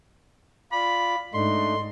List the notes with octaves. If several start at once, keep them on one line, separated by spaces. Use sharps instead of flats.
F4 D5 B5
G#2 A3 D4 D#4 C6